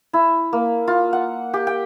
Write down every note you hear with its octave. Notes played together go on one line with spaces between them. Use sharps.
E4
A#3
F4
F#5
G4
G5